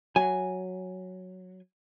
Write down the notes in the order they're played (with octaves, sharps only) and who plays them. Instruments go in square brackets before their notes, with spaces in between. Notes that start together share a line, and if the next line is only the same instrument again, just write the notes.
[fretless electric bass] F#3 [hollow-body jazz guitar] G#5